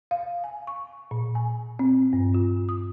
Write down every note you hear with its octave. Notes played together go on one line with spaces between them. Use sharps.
F5
G#5
C#6
A#2
G#5
C4
G2
F4
D#6